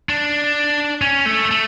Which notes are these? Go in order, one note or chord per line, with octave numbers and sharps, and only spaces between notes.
D4
C#4
A3
A3